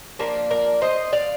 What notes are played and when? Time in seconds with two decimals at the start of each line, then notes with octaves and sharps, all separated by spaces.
0.19 F3 A#3 D4 A#4 D5
0.51 A#4 D5
0.82 C5 D#5
1.13 D5 F5